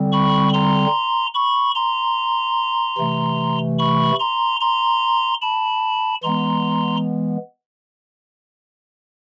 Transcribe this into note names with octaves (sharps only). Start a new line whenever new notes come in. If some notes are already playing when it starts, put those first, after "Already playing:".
Already playing: D3 G3 C4
B5 C#6
A#5 C6
B5 C#6
A#5 C6
C3 E3 A3
B5 C#6
A#5 C6
A#5 C6
A5 B5
E3 G#3 B3 A#5 C6